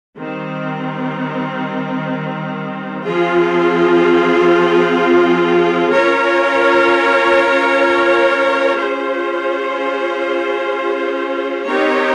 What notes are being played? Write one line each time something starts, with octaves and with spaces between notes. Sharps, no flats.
D#3 G3 C4
F3 C4 F4 G#4
C#4 F4 A#4 C#5
C#4 F4 G#4 C5
C4 D#4 G4 A#4 C#5